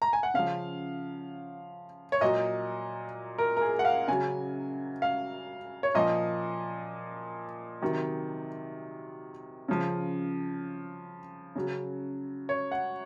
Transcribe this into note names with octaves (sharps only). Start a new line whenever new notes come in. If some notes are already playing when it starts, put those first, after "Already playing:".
A#5
G#5
F#5
C#3 F3 F5
C#5
A#2 F#3 D#5
A#4
A#4
G#4
F#5
F5
C#3 F#3 G#5
F5
C#5
A#2 F3 D#5
C3 D#3 F#3
C#3 F3
C#3 F#3
C#5
F#5